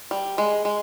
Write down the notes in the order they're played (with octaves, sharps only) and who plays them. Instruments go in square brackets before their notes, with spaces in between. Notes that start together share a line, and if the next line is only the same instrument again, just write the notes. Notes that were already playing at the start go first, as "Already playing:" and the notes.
[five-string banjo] G3
G#3
G#3